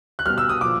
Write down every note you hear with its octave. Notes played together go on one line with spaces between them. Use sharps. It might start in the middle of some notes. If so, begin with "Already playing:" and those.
F#6
B2 G3 F6
E6
D#6
A#2 F3 D6